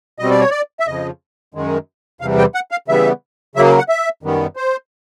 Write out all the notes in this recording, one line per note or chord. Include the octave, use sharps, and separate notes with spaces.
B2 G3 C4 D#5
D5
C#5
D5
E5
F2 C#3 F3 D#5
F#2 D#3 G#3
E2 C3 E3 G3 F5
G5
F#5
F5
C#3 E3 G3 B3 E5
C#3 F#3 A#3 E5
F#5
E5
F#2 D#3 G3 B3
C5